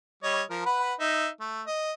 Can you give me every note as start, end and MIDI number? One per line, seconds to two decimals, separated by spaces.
0.23 0.42 55
0.23 0.42 73
0.23 0.42 75
0.50 0.62 53
0.50 0.62 70
0.66 0.94 71
0.66 0.94 78
0.66 0.94 83
1.00 1.28 63
1.00 1.28 76
1.41 1.62 57
1.67 1.92 75